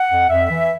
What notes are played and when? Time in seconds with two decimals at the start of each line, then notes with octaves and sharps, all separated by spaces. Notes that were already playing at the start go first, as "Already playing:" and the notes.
Already playing: F#5
0.10 F2
0.29 F2 E5
0.49 E3